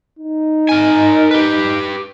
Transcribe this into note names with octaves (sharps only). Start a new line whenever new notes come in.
D#4
A#4 G#5
G4 B4